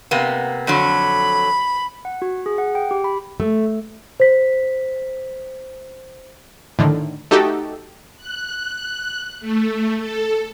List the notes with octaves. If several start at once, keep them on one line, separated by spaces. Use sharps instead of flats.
C3 A#3 B3
F2 D3 F#3 B5
F#5
F#4
G#4
F#5
G5
G4
B5
A3
C5 B6
A2 D3 D#3
A3 D#4 F#4 G4 A4
F#6
A3
A4